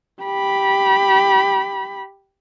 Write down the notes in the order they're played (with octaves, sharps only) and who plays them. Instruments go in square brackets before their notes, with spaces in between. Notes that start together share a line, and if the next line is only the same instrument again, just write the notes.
[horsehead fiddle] G4 B5